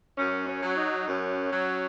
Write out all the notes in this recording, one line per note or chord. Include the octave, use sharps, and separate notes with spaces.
F#2 C#4
C#4
F#3
D#4
F#2 C#4
F#3